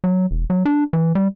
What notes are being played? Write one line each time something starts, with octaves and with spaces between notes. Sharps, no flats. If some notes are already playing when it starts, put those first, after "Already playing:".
F#3
E1
F#3
D4
E3
G3